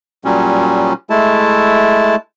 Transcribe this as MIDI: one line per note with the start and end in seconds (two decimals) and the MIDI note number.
0.25 0.93 46
0.25 0.93 54
0.25 0.93 55
0.25 0.93 61
1.10 2.16 56
1.10 2.16 57
1.10 2.16 64
1.10 2.16 81